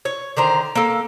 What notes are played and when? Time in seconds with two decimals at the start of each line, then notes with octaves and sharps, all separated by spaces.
0.05 C#5
0.37 D3 D#3 C5 A#5
0.75 A#3 A4